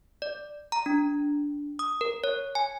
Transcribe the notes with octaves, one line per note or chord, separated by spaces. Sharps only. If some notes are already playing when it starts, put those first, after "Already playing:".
D5
A#5
D4
D#6
A#4
C#5
G#5